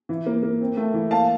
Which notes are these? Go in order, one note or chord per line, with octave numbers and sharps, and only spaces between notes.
E3
A#3
A#3
C4
A3
E3
A#3 F5 A5